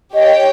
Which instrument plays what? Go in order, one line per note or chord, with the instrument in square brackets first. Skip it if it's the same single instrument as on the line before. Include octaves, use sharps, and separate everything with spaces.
[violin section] G4 C#5 G5 [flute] D#5